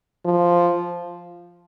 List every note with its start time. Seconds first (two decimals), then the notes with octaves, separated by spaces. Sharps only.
0.25 F3